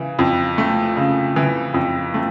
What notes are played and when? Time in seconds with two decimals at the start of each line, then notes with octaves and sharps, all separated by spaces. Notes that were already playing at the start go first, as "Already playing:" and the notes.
Already playing: C#3 E3
0.19 F2
0.58 A3
0.97 C#3
1.36 E3
1.74 F2
2.14 A3